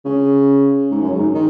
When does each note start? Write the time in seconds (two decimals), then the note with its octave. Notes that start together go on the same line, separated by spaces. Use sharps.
0.05 C#3
0.91 G#2
1.01 F#2
1.12 G#2
1.35 D#3